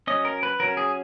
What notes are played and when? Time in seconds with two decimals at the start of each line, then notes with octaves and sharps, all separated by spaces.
0.07 F#3 C#4 D#5
0.25 A#4
0.43 B4
0.60 F#3 C#4 A#4
0.77 G#4